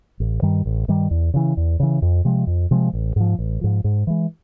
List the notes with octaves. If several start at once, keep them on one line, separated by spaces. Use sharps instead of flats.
A1
G2 D#3 G3
A1
G2 D#3 G3
E2
C#3 E3
E2
C#3 E3
F2
C3 F3 G#3
F2
C3 F3 G#3
A1
G#2 F3
A1
G#2 F3
G#2
E3 G#3